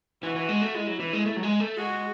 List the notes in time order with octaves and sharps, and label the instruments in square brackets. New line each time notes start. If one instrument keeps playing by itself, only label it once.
[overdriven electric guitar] E3 [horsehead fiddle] F#4
[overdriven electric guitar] E3
G#3
A3
[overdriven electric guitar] G#3 [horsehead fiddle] E4
[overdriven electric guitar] F#3
E3
G#3
A3
F#3
G#3
A3
[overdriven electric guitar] G#3 [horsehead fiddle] F#4